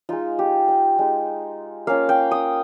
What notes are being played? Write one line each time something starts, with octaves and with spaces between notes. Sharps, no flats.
G#3 D#4 F4
G4
D#5
G#3 D#4
A#3 C#4 F4 F5
G5
D#6